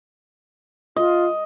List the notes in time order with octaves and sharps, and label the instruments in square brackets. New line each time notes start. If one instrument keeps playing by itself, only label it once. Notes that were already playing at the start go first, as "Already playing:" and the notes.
[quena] F4 [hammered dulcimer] D#5